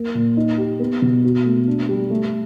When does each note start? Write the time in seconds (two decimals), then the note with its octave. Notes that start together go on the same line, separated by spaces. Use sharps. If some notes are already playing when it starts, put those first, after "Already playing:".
Already playing: A#3
0.15 A#2
0.37 D#4
0.58 G4
0.80 B3
1.02 B2
1.24 F#4
1.46 A3
1.68 D4
1.89 G3
2.10 A3